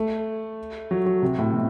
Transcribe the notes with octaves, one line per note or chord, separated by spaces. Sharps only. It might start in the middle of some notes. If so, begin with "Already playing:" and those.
Already playing: A3
F#3
F#3
C3
A2
B2